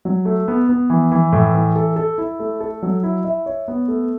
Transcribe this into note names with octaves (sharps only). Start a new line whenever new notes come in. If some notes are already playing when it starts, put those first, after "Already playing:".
F#3
A3
B3
B3
E3
E3
A2
E3
A4
A4
E4
A3
A4
F#3
E4
E5
C#5
B3
A3